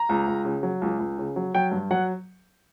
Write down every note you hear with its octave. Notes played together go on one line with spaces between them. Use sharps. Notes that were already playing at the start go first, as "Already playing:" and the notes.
Already playing: A#5
C#2
C#2
C#3
F#3
C#2
C#2
C#3
F#3
F#3 G5
G2
F#3 F#5